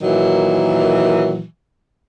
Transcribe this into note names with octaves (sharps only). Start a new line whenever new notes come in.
A#2 D#3 E3 F#3